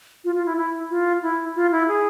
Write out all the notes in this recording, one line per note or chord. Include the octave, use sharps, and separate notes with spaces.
F4
F4
E4
E4
F4
E4
F4
E4
G#4